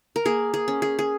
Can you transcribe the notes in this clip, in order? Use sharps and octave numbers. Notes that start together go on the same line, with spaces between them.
A#4
A#3 G#4
G#4
C#4
G#4
G#4